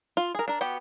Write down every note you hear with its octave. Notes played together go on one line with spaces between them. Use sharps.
F4
G#4 A#4
D4 A#4
B3 F#4 G4 F#5